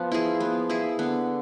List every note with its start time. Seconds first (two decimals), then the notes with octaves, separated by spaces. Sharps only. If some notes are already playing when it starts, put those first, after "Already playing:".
Already playing: F3 B3
0.12 E4 G#4
0.40 B3
0.70 E4 G#4
0.99 D3 B3